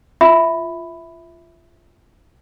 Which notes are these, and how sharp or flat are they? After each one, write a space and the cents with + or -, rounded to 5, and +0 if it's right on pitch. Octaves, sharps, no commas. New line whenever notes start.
F4 -15 E5 -5 B5 +10